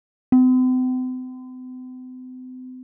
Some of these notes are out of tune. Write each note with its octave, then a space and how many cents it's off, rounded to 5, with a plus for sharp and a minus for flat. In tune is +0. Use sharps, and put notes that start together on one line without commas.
C4 -45